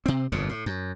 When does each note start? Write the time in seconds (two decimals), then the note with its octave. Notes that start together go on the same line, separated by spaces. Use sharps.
0.06 C3 C4
0.32 G1 F2 A#2 C#3
0.49 A2
0.66 F#2